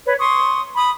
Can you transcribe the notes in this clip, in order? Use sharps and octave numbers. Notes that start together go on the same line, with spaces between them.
B4 C#5
C6 C#6 D#6
B5 D#6